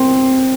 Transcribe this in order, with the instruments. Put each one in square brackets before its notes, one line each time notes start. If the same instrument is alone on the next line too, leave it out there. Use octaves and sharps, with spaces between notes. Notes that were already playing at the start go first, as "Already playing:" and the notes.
Already playing: [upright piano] C4